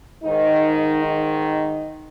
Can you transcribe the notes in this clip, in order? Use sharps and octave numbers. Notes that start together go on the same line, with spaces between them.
G#2 D#3 D#4
D#4